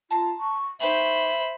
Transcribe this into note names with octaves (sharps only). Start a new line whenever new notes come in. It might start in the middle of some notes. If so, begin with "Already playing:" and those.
F4 A5 A#5 C6
C#6
D#4 G4 C5 C#5 E5 B5